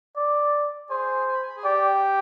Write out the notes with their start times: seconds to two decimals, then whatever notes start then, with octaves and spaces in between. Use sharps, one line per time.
0.16 D5
0.89 G#4 C5 G#5
1.27 G#5
1.34 B5
1.42 G#5
1.49 B5
1.56 G#4 G#5
1.64 G4 D5 G5